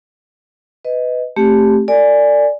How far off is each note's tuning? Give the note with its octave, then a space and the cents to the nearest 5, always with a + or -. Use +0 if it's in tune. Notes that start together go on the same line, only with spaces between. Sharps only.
B4 +15 D#5 +10
A3 +0 C4 +25 G4 +5
A4 +45 D5 +0 G#5 -5